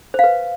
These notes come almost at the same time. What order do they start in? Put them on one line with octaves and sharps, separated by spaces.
C5 F5 B4